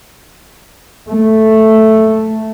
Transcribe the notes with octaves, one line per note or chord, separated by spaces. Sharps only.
A3